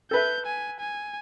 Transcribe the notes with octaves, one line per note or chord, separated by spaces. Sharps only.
A4 B4 E5 G6
G#5
G#5